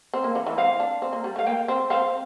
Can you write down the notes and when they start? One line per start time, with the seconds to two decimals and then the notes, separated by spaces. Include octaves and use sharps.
0.14 C4
0.24 A#3
0.35 E3
0.46 E3
0.58 C4 F5
0.80 D4
1.02 C4
1.13 A#3
1.24 G3
1.36 A3 F5
1.46 A#3 G5
1.68 C4
1.90 C4 F5